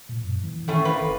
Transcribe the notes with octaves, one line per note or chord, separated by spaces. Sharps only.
A#2
F#2
E3
A2 D#3 A3 C#4
A#3 B4
E1